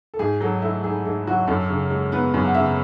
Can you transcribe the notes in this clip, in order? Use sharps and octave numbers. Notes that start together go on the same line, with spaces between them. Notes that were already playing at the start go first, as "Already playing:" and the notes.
A4
G#2 G#4
F#3 A4
A3 E4
G#2 G#4
G#2 A4
F#3 F#4
F#2 A4
C#3
G#3
B3 B4
F#2
F#5
C#3 E5